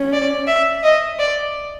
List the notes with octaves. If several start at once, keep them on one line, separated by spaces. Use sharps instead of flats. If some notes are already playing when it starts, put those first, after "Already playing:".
Already playing: C#4
D5
E5
D#5
D5